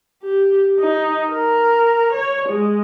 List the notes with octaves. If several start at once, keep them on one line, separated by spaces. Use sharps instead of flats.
G4
D#4
A#4
C#5
G#3